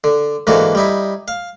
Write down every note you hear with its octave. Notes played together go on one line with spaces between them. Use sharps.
D3
G#2 D3 E3 A#3 F#4
G3 D#4 E4
F5